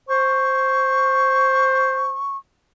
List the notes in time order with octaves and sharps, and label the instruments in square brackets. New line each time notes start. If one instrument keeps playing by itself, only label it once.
[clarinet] C5 [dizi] C#6